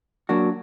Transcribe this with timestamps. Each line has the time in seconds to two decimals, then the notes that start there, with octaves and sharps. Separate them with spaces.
0.29 F#3 A#3 D4 F#4